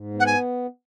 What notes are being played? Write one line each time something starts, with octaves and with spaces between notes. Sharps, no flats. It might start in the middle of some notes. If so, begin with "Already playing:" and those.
Already playing: G#2
B3
F#5
G#5